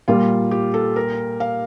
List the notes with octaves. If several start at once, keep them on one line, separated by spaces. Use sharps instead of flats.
A#2 G3 A#3 F4
G4
A4
A#4
F5